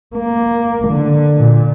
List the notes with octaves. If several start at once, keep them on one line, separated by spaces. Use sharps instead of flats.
A#3
D3
A#2